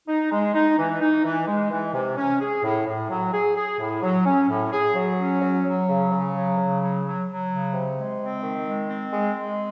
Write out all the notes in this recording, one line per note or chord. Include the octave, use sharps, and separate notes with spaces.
D#4
G#3
D#4
E3
D#4
E3
G#3
E3
C3
C#4
G#4
A2
A2
F#3
G#4
G#4
A2
F#3
C#4
A2
G#4
F#3
C#4
F#3
F#3
C#3
C#3
F#3
C#3
F#3
F#3
F#3
C#3
C3
G#3
C4
D#3
G#3
C4
G#3
G#3